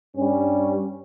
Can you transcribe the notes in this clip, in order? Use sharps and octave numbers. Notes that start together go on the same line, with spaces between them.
G2 G3 C#4